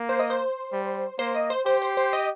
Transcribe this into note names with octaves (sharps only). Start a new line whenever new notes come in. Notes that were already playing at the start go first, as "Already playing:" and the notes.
Already playing: A#3
C5
D#5
C5
G3
A#3 C5
D#5
C5
G4 C5
C5
C5
D#5